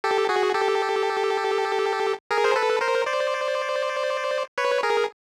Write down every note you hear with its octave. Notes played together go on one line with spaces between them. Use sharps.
G4 A4
F#4 G#4
G4 A4
G#4 A#4
C5
A4 B4
A#4 C5
C5 D5
B4 C#5
G#4 A#4